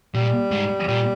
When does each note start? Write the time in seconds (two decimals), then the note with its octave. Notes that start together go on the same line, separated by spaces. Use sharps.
0.14 A#2 G3
0.51 G#2
0.88 A#2 G3